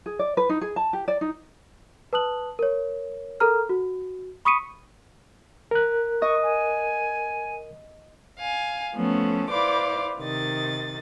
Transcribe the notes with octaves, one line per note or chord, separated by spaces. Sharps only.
G#4
D5
B4
D#4
G#4
A5
G4
D5
D#4
B4 A5 D#6 F#6 F#7
A#4 C#5
A4 A#4 A#5 F6
F#4
B5 C#6 D#6 B6 C#7 D#7
A#4 F#6
D#5 C#6
G#5
F5 G#5
F3 A3 B3 C#4 A4
E4 B4 C5 D5 F5 D6
C3 D#3 D#5 A6